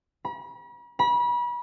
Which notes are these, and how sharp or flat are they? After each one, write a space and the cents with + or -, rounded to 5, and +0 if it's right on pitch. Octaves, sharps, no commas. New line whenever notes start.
B5 -45
B5 -35